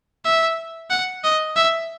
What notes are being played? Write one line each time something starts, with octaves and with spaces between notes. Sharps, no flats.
E5
F#5
D#5
E5